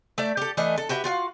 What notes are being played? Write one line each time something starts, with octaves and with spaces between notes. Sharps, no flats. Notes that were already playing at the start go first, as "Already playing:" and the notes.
A3 D5 E5
G4 A4
E3 A3 D4 D#5
A4
F#4 G4 B4 E5
F4 F#4 F5